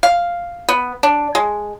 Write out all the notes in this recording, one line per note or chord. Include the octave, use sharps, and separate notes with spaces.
F5
B3
D4
G#3